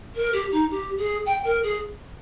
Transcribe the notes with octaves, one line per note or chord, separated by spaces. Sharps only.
A#4
G4
D#4
G4
G#4
G5
A#4
G#4